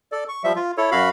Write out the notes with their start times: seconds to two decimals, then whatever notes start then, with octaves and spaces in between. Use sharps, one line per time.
0.12 A4 D5
0.29 C#6
0.44 F3 G3 E5
0.56 F4
0.77 E4 A4 C#5
0.91 F#2 F#4 F5 B5